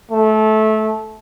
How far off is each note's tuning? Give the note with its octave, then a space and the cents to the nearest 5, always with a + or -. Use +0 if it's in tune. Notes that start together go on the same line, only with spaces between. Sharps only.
A3 -20